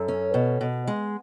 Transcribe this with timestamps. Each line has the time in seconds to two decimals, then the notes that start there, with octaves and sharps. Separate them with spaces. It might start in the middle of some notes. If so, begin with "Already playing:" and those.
Already playing: F#2 A4
0.08 C#4
0.34 B2
0.61 B2
0.87 G#3